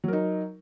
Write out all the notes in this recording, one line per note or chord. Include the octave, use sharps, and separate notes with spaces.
F#3 D#4 A#4